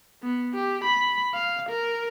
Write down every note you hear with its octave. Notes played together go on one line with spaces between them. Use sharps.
B3
G4
B5
F5
A#4